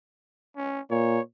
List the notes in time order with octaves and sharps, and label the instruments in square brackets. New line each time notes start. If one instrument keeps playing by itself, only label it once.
[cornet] C#4
[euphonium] A#2 [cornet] C#5